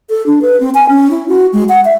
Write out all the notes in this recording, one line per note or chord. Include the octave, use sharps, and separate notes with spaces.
A4
D4
B4
C4
G#5
C#4
E4
F#4
G#3
F#5
E5